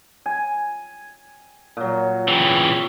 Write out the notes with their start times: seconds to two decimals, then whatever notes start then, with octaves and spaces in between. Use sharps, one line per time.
0.26 G#5
1.77 A#2 F#3
2.28 C#3 E3 G4